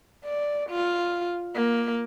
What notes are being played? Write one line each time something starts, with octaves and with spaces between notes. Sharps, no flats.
D5
F4
A#3